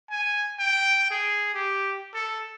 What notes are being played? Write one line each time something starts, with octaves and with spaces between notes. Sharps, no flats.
G#5
G5
G#4
G4
A4